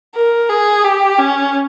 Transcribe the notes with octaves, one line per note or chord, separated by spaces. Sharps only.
A#4
G#4
G4
C#4